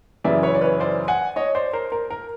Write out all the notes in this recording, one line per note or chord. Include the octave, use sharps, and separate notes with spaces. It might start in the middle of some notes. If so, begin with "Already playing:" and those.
F#2 C#3 E3 D5 E5
B4 C#5
D5
B4 C#5
C5 D5
F#5 G#5
C#5 D#5
C5 D5
A#4 C5
A#4
A#4